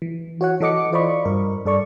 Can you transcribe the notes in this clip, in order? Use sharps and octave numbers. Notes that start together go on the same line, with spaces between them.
E3
F#4 C#5 F#5
E3 A4 D#5 D6 C#7
F4 C5 D5 D#5 B5 C#6
G2 A#4
G2 A4 D5 C#6